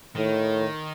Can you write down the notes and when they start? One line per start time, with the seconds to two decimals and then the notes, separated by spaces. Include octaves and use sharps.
0.16 A2 D#3